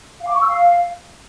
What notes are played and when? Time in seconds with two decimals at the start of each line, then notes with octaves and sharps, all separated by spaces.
0.20 F5
0.27 D6
0.34 C#6
0.41 E6
0.47 F5